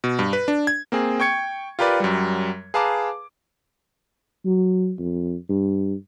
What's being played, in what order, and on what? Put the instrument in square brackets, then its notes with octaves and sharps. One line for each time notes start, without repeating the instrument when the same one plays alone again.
[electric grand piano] B2
G2
B4
D4
G#6
A#3 C4 G#4
G5 C#6 G#6 C#7
F4 G4 A#4 B4 D5
F#2 F#3 G3
G#4 B4 F5 A5 A#5 D6
[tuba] F#3
F2
G2